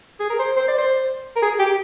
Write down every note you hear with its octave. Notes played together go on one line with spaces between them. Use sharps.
G#4
A#4
C5
C5
D5
C5
A#4
G#4
G4